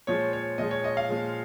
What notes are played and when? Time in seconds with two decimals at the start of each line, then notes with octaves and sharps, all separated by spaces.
0.07 A#2 F3 G#3 C#5
0.33 C#5
0.58 A#2 F3 G#3 D#5
0.71 C#5
0.84 D#5
0.97 F5
1.09 A#2 F3 G#3